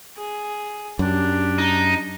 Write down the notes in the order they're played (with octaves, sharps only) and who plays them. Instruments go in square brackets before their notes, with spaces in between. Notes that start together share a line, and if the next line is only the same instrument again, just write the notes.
[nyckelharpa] G#4
[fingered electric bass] F#2 [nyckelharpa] D4 G4
[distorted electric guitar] D#4